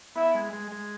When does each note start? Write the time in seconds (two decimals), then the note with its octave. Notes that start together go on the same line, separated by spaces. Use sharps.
0.15 B3 E4
0.34 G#3
0.53 G#3
0.72 G#3